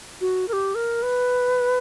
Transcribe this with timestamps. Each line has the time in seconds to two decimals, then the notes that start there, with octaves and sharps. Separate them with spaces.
0.21 F#4
0.48 A#4
0.53 G4
0.75 A#4
1.03 B4